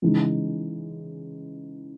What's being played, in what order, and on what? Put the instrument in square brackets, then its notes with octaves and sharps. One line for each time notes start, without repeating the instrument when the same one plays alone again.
[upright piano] C#3 E3 G#3 D#4